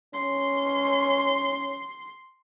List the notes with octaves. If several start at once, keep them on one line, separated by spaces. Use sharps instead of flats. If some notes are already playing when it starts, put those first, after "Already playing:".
C#4 C6